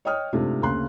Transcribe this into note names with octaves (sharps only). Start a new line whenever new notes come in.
C#5 D#5 G5 D#6 F6
G#2 C3 A3 D4 F4
D2 C#3 A#3 C6 F#6